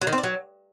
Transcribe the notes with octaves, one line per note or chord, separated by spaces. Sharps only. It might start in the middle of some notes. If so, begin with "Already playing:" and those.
F#3
D#3
C4
D4
F#3